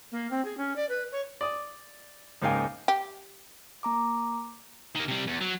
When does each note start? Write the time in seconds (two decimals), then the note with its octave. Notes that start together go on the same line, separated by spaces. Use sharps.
0.12 A#3
0.30 C4
0.45 G#4
0.57 C#4
0.76 D5
0.89 B4
1.12 C#5
1.41 D5 D#6
2.42 C#2 G#2 A#3 F5 G5 G#5
2.88 G4
3.83 A#3 A#5 D6
4.95 D#3 A#3
5.08 C3 G3
5.27 E2
5.41 F#3